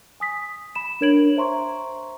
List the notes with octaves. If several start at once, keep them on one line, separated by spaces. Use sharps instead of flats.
G#5 D#6 B6
B5 E7
D4 A#4 C#5 G#6 D7 F#7
C5 E5 A#5 C6 C#6